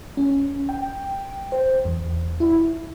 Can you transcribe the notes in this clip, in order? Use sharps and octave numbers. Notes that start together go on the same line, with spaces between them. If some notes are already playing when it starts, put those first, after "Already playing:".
C#4
G5
C5
E2
E4